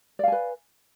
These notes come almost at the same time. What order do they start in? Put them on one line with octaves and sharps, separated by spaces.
D5 F5 G#5 B4